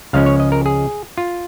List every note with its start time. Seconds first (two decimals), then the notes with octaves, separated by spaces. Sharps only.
0.13 C#2 C#3 F3 G#3 C#4 F5
0.26 C#5
0.40 D#5
0.52 A#4
0.66 G#4
1.18 F4